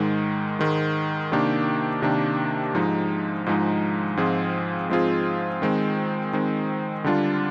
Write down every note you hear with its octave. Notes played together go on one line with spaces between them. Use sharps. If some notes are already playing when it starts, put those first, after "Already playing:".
Already playing: G#2 D#3 G#3
G#2 D#3 G#3
C3 D#3 A#3 D4 G4
C3 D#3 A#3 D4 G4
G#2 F3 G#3 D#4
G#2 F3 G#3 D#4
G#2 F3 C4 F4 G#4
G#2 F3 C4 F4 G#4
D#3 G#3 C4
D#3 G#3 C4
D3 G3 D4 F4